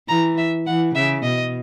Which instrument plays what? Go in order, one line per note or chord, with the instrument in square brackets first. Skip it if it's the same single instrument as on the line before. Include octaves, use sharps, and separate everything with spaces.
[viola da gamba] E3 [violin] A#5
[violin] E5
[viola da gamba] E3 [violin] F#5
[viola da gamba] C#3 [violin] E5
[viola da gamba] B2 [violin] D#5